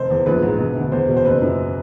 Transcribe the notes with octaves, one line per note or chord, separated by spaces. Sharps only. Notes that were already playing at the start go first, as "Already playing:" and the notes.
Already playing: F1 C5
E2
A#1 B4
G#2
E1
D2
E2 C5
B2
C5
F#1 B4
F#2